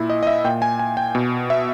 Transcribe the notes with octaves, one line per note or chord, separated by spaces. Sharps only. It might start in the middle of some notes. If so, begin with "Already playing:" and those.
Already playing: A#2 E4
D#5
D#5
E5
A#2 G5
G#5
G#5
G5
B2
E5